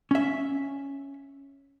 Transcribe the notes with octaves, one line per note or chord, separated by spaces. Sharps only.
C#4 E5